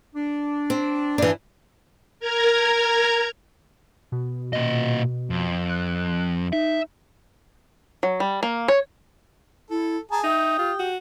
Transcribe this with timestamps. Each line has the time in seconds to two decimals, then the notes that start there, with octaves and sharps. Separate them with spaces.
0.15 D4
0.70 C4
1.18 G2 E3 D4
2.20 A#4 A#5 G#6
4.12 B2
4.53 A#2 D#5
5.30 F2
5.69 F#6
6.53 D#4 E5
8.03 F#3
8.20 G3
8.43 A#3
8.68 C#5
9.70 E4 A4
10.11 G#4 A5 A#5
10.24 D#4 E5 G5 D#6
10.59 F4 G4
10.79 F#4